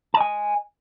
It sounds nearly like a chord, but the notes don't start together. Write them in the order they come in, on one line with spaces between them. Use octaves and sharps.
A5 D#5 G#5